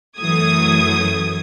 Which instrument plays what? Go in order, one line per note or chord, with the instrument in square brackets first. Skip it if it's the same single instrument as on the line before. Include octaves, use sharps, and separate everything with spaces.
[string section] F#2 E3 F#3 A3 D#6 G#6